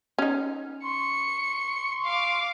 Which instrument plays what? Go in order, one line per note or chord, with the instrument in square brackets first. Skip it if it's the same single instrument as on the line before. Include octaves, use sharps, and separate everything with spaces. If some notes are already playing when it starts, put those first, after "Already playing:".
[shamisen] C#4 D#4
[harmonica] C6 C#6 [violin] C#7
[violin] F5 D6